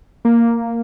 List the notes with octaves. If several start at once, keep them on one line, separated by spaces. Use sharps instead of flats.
A#3